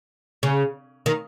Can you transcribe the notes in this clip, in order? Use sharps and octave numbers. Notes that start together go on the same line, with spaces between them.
C#3
D#3